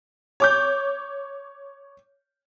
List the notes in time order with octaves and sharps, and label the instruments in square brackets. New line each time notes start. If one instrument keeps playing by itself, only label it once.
[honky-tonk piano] C#5 D6 G6